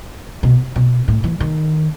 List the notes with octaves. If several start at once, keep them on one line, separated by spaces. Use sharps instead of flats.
B2
B2
A2
E3
D#3